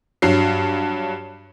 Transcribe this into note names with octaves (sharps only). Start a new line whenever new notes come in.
G2 F#3 C7